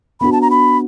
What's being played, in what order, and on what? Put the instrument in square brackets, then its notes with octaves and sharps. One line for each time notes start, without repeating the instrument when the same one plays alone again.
[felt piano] B3 D4 F#4 [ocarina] B5
[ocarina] A5
A#5
B5